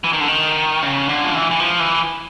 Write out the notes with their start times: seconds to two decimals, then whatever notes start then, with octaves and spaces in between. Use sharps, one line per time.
0.04 E3
0.13 D#3
0.20 D3
0.28 D#3
0.82 C#3
1.09 D3
1.24 F3
1.34 E3
1.51 E3
1.60 F3
1.80 E3